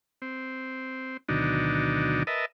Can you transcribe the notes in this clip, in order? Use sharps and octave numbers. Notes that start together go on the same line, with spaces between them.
C4
D2 B2 D#3 F#3 D4 D#4
A#4 B4 D#5 E5 A5